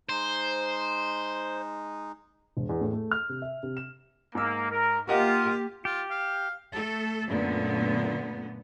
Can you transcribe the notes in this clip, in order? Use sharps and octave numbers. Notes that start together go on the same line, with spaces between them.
G#3 D#4 C5
E1
E2
A2
A3
F6
C3
E5
C3
E7
G#2 A#3 E6
A#4
A#3 F4 G4 A#4 D#5 F#5
F4 G4
F5
A3 A4
F#2 A#2 D3 A3 B3